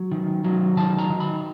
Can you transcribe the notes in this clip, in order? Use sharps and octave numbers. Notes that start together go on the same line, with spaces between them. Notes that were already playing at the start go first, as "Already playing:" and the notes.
Already playing: F#3
D#3
F#3
D#3 A5
A#5
D#3
B5